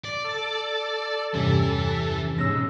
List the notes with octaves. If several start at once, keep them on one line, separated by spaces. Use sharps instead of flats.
D5
A4
E2 G2 C3 E3 C#4
G#2 B2 C#4 E6 A#6